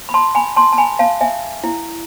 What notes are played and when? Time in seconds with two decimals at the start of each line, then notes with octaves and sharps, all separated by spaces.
0.09 B5
0.14 A5 C6
0.35 G#5 B5
0.56 A5 C6
0.72 A5
0.78 G#5 B5
0.99 F5 A5
1.21 E5 G#5
1.64 E4